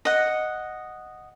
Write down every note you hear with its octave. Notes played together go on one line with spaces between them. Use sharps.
D#5 F#5